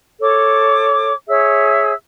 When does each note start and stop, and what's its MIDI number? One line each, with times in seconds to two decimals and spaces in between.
0.20 1.12 69
0.20 1.12 73
0.20 1.12 86
1.28 1.93 68
1.28 1.93 73
1.28 1.93 76
1.28 1.93 88